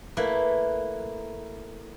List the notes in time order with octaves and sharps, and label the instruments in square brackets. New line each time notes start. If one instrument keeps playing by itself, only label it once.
[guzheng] A3 A#3 E4 A#4 B4